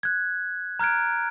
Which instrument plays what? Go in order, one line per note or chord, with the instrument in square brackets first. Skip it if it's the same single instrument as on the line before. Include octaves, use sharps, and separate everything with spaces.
[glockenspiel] F#6 G#6
A#5 F6 F#6 G#6 D7